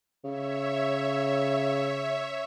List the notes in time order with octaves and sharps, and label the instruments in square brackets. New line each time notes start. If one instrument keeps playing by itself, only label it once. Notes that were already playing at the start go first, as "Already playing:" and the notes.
[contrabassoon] C#3 [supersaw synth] C#5 E5